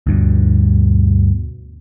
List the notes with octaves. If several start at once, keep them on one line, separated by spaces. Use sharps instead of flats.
D2 G2 B2